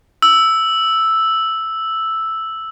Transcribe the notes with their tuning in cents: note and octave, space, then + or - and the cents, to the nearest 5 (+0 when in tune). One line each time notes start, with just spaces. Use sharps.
E6 +0